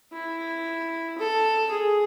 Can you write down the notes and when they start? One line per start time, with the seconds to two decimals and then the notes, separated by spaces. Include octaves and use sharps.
0.13 E4
1.18 A4
1.71 G#4